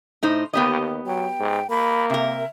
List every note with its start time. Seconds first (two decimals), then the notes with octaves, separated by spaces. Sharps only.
0.23 A2 D#4 C5
0.53 D#2 B3 G4 D#5
1.06 F#3 G5
1.40 G#2
1.70 A#3 B5
2.10 C3 A#4 E5